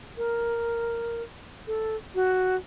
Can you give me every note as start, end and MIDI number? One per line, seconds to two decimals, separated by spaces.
0.17 1.23 70
1.67 1.96 69
2.15 2.56 66